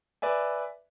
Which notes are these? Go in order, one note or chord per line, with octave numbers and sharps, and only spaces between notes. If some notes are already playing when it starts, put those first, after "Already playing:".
B4 D5 E5 G#5